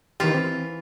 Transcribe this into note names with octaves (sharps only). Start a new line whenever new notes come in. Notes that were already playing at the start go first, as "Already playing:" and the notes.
D#3 E3 F4 G4
C4